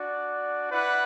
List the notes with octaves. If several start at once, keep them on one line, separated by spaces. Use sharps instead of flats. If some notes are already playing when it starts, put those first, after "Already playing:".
Already playing: D4 F#4 D5
E4 B4 D5 F#5